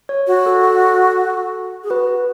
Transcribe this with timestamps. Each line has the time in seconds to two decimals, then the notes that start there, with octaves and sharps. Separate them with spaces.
0.09 C#5
0.27 F#4
0.46 A4
1.84 G#4
1.90 F#4 B4